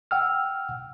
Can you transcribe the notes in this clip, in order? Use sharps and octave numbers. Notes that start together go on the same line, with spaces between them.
F#5 G5 E6 F6